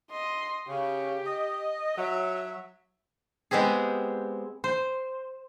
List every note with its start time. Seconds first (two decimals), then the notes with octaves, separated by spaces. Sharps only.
0.11 D#5 C6
0.68 C#3 G4
1.26 D#5
1.96 F#3 E5
3.51 G#3 B3 C4 G4 G#4
4.64 C5